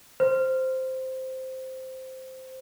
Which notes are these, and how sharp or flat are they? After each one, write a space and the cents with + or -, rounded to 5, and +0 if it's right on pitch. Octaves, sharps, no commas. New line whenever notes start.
C5 -5